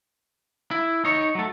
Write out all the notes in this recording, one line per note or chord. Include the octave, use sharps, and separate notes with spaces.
E4
D#4 C#5
F#3 A3